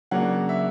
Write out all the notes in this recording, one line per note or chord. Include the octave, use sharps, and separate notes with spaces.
C#3 F#3 A#3 D4 F#5
E5